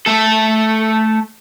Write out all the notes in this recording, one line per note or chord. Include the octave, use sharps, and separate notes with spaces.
A3 A4